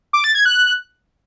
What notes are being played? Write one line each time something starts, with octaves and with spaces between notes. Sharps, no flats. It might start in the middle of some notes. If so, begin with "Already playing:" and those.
D6
A6
G#6
F#6